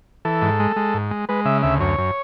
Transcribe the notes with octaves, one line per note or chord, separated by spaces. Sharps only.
E3 A4
G#2
G#3
G#3
G#2
G#3
G#3 B4
C#3 E5
D2 E5
F#2 C#5
F#2